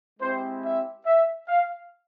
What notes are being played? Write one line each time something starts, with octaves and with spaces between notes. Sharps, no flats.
G#3 C4 E4 G4 C5
E5
E5
F5